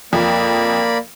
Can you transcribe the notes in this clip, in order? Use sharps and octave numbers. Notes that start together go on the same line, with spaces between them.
F2 A#3 D5 B5